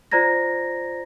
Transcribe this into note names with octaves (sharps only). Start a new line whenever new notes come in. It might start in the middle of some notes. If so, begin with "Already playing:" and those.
F4 C5 D5 A#5 G#6 A#6